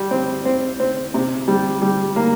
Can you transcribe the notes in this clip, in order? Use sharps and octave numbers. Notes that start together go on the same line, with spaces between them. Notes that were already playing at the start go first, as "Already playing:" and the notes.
Already playing: G3
C4
C4
C4
C3
G3
G3
A#3